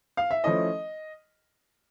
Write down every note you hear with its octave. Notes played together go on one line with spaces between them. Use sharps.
F5
E5
F3 A3 C#4 E4 D#5